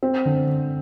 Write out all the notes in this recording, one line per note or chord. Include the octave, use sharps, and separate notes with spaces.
C4
D3